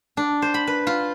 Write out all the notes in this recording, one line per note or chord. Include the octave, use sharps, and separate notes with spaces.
D4
C5
B5
B4
F4